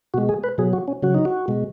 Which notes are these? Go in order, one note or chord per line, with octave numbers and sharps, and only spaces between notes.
B2 G#3 F#4
G#4
B4
B2 F#3 G#4
F#4
C#4
C#3 F#3 F#4
D#4
F#4
B2 G#3